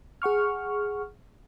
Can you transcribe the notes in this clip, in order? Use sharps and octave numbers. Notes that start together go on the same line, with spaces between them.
G#4 F#5 C#6 F6